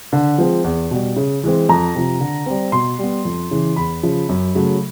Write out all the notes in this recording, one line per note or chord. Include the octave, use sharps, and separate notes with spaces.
D3
F3 G#3 C4
E2
B2 G3
C#3
E3 G#3 C4
F2 A#5
C3 F3
D3
G3 C4
B2 C6
G3 B3
F2
C#3 E3
E2 B5
C#3 F3
F#2
C#3 F#3 A3